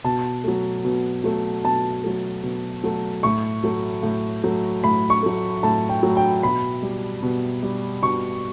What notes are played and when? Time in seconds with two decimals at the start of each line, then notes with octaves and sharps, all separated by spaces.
0.04 B2 A5
0.44 F#3 A3
0.84 B2
1.24 F#3 A3
1.64 B2 A5
2.04 F#3 A3
2.43 B2
2.84 F#3 A3
3.23 A2 C#6
3.64 F#3 A3
4.03 A2
4.44 F#3 A3
4.84 A2 B5
5.10 C#6
5.23 F#3 A3
5.63 A2 A5
5.89 G5
6.03 F#3 A3
6.17 G5
6.43 B2 B5
6.82 G3
7.23 B2
7.63 G3
8.03 B2 C#6